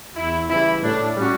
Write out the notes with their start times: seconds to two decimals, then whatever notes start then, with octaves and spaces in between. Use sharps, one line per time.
0.15 E2 E4
0.49 C#3 E3 G3 E4
0.82 A2 D4
1.17 G3 C#4 F#4